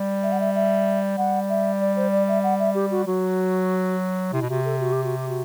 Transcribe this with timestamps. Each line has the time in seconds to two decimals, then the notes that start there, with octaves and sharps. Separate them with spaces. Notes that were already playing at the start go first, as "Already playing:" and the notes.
Already playing: G3
0.23 E5
0.32 F#5
0.40 E5
0.55 E5
1.17 G3 F#5
1.49 E5
1.81 D5
1.96 C5
2.12 D5
2.28 E5
2.43 F#5
2.59 E5
2.75 G4
2.91 F#4
3.07 F#3 F#4
4.33 C3 E4
4.41 B2
4.49 C3 F#4
4.65 A4
4.80 F#4
4.92 G4
5.04 F#4
5.16 G4
5.29 F#4